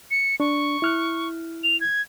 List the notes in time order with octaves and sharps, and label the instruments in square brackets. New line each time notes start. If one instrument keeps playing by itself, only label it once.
[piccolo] C#7
[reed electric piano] D4 [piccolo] C#6
[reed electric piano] E4 F6 F#6
[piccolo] F7
G#6